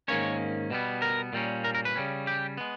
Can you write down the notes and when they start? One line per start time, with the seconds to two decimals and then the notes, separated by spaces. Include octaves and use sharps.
0.08 G#2 D#3 A#3 C#4 C#5
0.71 B2 G3 B3
1.02 A#4
1.33 A#2 G3 A#3 C#4
1.64 A#4
1.75 A#4
1.85 B4
1.96 C#3 G3 C#4
2.27 G4
2.58 G#3 B3